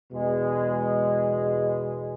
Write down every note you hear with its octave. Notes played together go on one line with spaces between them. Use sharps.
E2 B2 G#3